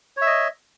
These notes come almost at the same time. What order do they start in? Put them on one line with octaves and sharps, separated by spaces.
C#5 E5 D#5